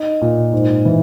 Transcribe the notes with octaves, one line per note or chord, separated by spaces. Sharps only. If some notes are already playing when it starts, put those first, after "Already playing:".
Already playing: D#4
A#2
G#2
E3